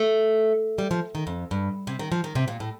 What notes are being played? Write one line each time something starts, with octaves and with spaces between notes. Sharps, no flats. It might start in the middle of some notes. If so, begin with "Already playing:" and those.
Already playing: A3
G3
F3
D#3
F2
G2
C3
D#3
F3
D#3
C3
A#2
A2